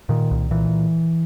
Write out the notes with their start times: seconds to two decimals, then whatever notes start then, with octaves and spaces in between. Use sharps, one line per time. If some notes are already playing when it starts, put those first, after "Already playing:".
0.09 A#2 D#3
0.31 C2
0.51 A#2 E3